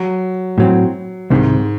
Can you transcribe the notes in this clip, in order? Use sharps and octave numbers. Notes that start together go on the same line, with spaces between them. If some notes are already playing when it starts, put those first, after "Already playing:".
Already playing: F#3
A2 F#3 C4
C2 G#2 C3 D#3